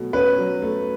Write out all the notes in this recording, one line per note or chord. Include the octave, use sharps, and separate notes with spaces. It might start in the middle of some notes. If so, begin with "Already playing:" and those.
Already playing: B2 F#3 A3
C#4 B4
F#3
A3